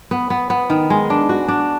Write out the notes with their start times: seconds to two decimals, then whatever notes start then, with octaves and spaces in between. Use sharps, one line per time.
0.11 B3
0.30 B3
0.50 B3
0.70 D#3
0.90 G#3
1.10 D4
1.29 F#4
1.48 D4